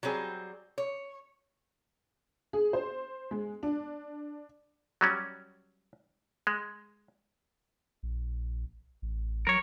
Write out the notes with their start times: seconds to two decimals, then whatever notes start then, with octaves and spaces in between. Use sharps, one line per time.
0.03 F#3 G3 C4 G#4
0.78 C#5
2.53 G#4
2.73 C5
3.31 G#3
3.63 D4
5.01 F#3 G3 C#4
6.47 G#3
8.03 A#1
9.02 A1
9.47 F#3 A#4 C#5